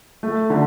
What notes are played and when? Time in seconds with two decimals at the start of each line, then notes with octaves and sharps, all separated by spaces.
0.23 A3
0.50 D3